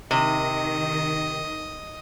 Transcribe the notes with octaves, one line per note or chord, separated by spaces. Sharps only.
C3 D#3 D#5